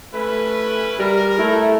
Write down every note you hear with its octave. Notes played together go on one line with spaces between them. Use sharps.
A3 C#4 E4 B4
G3 A#4
A3 E4